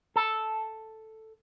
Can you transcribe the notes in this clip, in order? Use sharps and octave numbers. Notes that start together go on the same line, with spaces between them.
A4